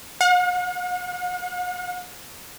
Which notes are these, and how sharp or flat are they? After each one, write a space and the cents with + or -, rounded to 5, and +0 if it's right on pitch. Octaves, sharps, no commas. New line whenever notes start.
F#5 -45